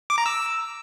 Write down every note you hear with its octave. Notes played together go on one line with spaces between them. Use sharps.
D6
A#5
E6